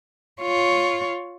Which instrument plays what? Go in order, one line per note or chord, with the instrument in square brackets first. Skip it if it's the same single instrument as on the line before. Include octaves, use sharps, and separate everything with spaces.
[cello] F4 C#5